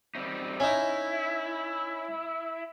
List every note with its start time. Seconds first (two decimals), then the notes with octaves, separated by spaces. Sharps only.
0.15 G3 C4 D#4
0.60 C#4 D#4 E4